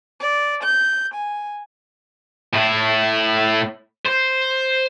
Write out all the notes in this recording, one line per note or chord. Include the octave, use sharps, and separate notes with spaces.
D5
G6
G#5
A2 E4
C5